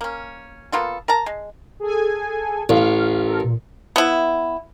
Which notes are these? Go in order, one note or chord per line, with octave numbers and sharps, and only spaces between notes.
A#3 C#4
A#3 B3 F4 A4
A#4 A5 A#5
G#3
G#4 A4 G#5
A1 F5
A4 A#4
A#2
B3 E4